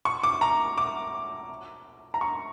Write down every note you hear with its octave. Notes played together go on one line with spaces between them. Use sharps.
C#6
D6
A#5
D6
A#5
C#6